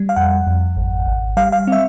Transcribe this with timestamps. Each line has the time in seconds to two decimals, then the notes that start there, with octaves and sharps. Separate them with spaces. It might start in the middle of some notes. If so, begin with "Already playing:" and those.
Already playing: G3
0.09 F5
0.16 F2 F#5
0.47 F2
0.77 G#1
1.07 G#1
1.37 G3 F5
1.52 F5
1.67 C4 E5